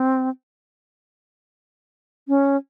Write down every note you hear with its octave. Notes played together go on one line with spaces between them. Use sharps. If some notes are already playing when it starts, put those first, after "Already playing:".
Already playing: C4
C#4